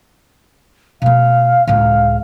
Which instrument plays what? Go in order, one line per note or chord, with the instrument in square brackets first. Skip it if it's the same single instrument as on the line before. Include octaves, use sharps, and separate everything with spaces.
[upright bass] B2 A3 [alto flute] F5
[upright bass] C#2 A2 [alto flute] F5